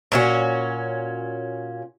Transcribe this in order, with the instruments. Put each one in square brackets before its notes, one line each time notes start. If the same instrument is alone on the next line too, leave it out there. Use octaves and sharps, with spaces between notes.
[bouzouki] A#2 C#4 F#4